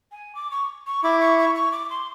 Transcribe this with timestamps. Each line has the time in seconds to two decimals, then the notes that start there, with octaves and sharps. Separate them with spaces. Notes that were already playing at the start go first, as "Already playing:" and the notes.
0.12 G#5
0.35 D6
0.51 C#6
0.87 C#6
1.03 E4 D6
1.21 C#6
1.39 C#6
1.55 C#6
1.72 D6
1.90 C6